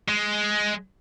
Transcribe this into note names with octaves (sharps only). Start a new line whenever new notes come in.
G#3